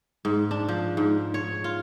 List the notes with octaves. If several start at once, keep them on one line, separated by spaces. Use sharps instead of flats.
G#2
D4
F3
G#2
C#5
F4